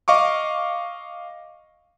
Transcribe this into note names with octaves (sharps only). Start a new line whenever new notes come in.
D#5 F5 C#6 D6